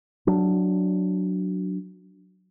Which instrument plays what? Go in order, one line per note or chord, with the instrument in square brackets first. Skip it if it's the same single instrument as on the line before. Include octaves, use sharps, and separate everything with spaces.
[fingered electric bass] F#3 D4